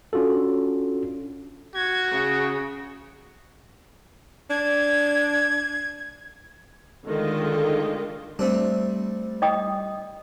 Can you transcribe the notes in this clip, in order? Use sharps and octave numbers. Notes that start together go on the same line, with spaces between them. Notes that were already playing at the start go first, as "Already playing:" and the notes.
C#4 D4 F4 F#4 A4
F#4 G#6
C#3
D4 G#6
D3 D#3 G#3 A3 F4 D#5
G3 A3 C4 D4
D#5 G5 D#6